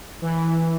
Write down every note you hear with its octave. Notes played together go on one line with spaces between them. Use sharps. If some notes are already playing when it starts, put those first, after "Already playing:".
E3